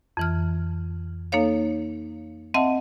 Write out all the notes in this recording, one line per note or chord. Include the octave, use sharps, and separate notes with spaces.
F2 E3 F6
A#3 D#4 A4 C#5 F5
C4 D#5 E5 F#5 A5